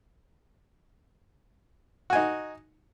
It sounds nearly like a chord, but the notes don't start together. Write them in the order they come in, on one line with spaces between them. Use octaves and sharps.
F#4 G#5 D#4